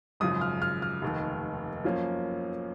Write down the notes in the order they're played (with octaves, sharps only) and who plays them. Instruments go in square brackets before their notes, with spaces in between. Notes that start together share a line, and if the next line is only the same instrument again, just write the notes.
[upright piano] G#1 F#2 C#3 F3 D#6
F6
F6
F6
F1 D#2 D#3
F#2 F3 A#3 C#4